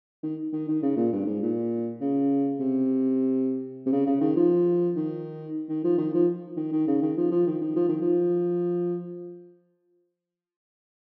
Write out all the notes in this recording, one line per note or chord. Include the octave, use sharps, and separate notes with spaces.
D#3
D#3
D#3
C#3
A#2
G2
G#2
A#2
C#3
C3
C3
C#3
C#3
D#3
F3
D#3
D#3
F3
D#3
F3
D#3
D#3
C#3
D#3
F3
F3
D#3
D#3
F3
D#3
F3